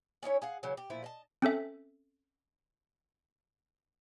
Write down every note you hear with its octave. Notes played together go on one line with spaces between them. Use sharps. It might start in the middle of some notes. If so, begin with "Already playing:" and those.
C#4 D#4 E4 C#5
G#4 F5 F#5
C#3 E3 F#3
G4
A#2 F3 E4
D#5 A5
C4 C#4 A4 E5